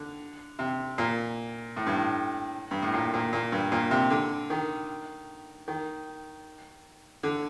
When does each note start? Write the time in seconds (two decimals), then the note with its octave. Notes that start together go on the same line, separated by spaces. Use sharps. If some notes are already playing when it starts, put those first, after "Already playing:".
Already playing: D3
0.59 C3
0.98 A#2
1.76 A2
1.87 G2
1.96 A2
2.71 G2
2.82 A2
2.94 A#2
3.14 A#2
3.33 A#2
3.52 G2
3.72 A#2
3.91 C3
4.10 D3
4.50 D#3
5.68 D#3
7.23 D3